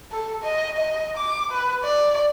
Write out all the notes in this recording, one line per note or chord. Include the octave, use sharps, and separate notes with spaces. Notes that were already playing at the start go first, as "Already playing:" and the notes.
A4
D#5
D#5
D6
B4
D5